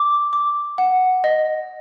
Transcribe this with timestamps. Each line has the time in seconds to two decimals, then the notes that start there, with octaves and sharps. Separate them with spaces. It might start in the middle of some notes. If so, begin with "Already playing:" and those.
Already playing: D6
0.33 D6
0.78 F#5
1.24 D#5